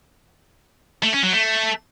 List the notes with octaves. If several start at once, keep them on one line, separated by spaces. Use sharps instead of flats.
A3
C#4
F#3
A3